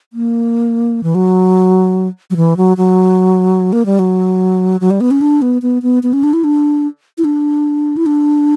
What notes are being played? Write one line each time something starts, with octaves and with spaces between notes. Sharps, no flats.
A#3
E3
F#3
F#3
E3
F#3
F#3
A#3
G3
F#3
F#3
G3
B3
C#4
D4
B3
B3
B3
B3
C#4
D4
E4
D4
E4
D4
E4
D4